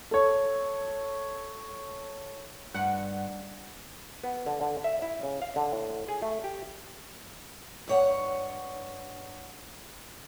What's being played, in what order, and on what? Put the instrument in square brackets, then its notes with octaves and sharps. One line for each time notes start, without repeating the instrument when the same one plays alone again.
[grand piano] A4 C#5
[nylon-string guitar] G2 [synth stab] F#5
[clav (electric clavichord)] B3
D3
D3
E5
E4
C#3
F5
D3
A2
G#4
A3
G4
[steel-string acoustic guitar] G2 C#5 F#5